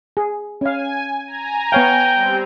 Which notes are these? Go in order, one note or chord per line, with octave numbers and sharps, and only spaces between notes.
G#4
C#4 F5 G#5
G#5 A#5
B3 C#5 F5 G5
G3 C4